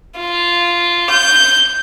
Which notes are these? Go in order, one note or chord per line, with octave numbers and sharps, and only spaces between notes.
F4
G6